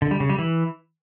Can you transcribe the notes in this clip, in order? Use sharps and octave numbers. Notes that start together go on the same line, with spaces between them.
D3
G3
C#3
G3
E3